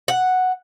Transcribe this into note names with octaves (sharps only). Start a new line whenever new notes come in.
F#5